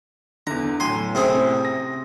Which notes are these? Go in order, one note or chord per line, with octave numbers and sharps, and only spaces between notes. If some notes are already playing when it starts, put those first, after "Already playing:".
E2 D3 A#5
A2 F#3 G#5 C6
F#2 A2 C3 C4 G#4
A#6